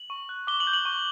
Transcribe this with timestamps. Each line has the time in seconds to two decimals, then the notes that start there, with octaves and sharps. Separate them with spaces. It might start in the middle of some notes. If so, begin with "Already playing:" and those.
Already playing: F#7
0.10 C#6
0.29 F#6
0.47 D6 G7
0.60 F#7
0.67 G6
0.73 F#7
0.85 C#6